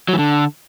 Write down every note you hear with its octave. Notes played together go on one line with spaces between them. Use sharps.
F#3
E3
D3